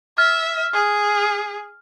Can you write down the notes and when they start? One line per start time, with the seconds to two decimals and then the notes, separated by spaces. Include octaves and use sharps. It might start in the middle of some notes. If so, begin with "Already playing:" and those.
0.18 E5 F6
0.73 G#4